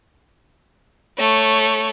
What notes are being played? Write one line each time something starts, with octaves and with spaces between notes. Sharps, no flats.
A3 C#5